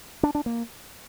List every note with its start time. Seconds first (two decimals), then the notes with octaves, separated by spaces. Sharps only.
0.23 D4
0.35 D4
0.46 A#3